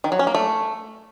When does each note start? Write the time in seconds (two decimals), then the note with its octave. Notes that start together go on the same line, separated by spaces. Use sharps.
0.04 D#3
0.12 F#3
0.19 C#4
0.27 A#3
0.35 A3